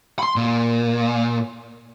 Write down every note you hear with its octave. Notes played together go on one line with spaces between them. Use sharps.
B5 C6
A#2